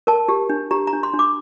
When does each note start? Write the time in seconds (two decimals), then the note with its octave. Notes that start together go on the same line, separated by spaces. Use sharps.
0.07 A#4 A5
0.29 G4
0.49 D4
0.71 G4 A#5
0.87 A#5
0.93 D4
1.03 C6
1.14 D4
1.19 D6